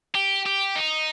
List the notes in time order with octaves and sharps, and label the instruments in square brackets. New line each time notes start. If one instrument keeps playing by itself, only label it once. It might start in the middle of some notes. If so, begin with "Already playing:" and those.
[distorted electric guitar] G4
G4
D#4